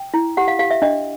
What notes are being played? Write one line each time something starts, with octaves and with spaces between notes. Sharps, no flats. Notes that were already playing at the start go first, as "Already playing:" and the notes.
Already playing: G5
E4
G4 F#5
F5
G4 F5
E5
D4 D#5